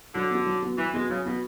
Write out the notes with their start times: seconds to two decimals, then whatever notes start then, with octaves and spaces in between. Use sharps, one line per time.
0.15 D3 F#3
0.31 B3 F#4
0.46 F#3
0.63 B3 F#4
0.78 E3 F#3
0.93 G#3 B3 F#4
1.10 C#3 F#3
1.26 B2 B3 F#4